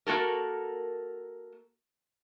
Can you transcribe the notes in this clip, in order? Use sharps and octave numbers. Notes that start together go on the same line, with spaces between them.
A#3 F#4 A4 A#4